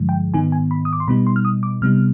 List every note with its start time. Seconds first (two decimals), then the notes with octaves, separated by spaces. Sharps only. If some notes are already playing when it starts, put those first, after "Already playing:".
Already playing: G2 D3 F3 G#3
0.09 G5
0.34 G#2 D#3 B3 D#4 G#5
0.52 G#5
0.71 B5
0.85 D#6
0.93 D6
1.00 C6
1.08 B2 G3 B3 D#4 B5
1.27 C6
1.36 F6
1.45 D#6
1.63 D6
1.82 C3 G3 B3 D#4 F6